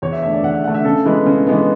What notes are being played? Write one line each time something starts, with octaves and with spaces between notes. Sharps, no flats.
E2 C#5
E5
D3 A3 E5
D5
E2 F#5
E5
D3 A3 F#5
E5
C#3 A4
E3 G#3 B3 B4
C#3
E3 G#3 B3